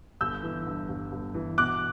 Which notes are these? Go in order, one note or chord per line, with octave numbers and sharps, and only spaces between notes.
G1 E6 G6
E3
G2
G1
G1
E3
B2 D6 F#6